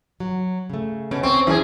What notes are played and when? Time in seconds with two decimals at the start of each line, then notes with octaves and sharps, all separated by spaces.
0.20 F#3
0.70 C#3 A3
1.11 B2 C#4
1.23 C4 C#6
1.47 F#2 E3 E4 G#4